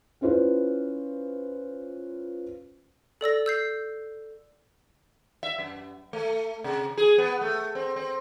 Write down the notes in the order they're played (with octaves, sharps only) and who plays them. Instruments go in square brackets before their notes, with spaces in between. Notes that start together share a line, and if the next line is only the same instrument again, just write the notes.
[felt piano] C#4 E4 F4 B4 C5
[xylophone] A4 D5 E6 A#6
E6 G6 C7
[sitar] E5
F#2
A3
C3
G#4
B3
A3
C4
C4